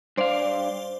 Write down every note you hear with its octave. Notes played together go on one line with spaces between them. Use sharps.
G2 C5 D5 F5